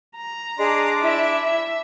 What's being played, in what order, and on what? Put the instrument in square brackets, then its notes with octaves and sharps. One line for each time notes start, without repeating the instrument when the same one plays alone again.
[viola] A#5
[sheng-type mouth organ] D4 D5 [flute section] G#4 D#5 C6
[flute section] E4 [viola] E5
[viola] E5